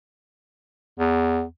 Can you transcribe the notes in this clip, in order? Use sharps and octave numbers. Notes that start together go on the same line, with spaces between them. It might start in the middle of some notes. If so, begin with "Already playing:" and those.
E2